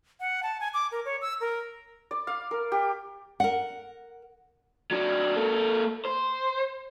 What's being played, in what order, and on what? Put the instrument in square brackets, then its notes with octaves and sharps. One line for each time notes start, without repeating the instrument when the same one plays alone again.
[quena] F#5
A5
G#5
D6
A#4
C#5
E6
A#4
[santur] D5
F5
A#4
G4
[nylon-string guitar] A#4 F#5
[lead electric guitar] F#3 D4
A#3 A4
C5